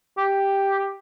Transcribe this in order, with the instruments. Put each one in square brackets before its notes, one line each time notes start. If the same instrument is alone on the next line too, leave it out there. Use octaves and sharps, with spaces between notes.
[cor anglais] G4